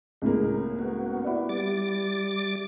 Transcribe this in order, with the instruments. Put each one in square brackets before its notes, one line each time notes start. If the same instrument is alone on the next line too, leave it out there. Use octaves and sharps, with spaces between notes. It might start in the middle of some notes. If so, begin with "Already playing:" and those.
[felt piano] C#2 A2 A#3 [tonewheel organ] G#3
[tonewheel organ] B3 F#4
[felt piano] E4 D5
[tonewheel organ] G3 D6 A6